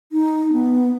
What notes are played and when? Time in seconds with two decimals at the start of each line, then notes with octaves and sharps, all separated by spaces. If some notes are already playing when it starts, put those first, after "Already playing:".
0.12 D#4
0.53 B3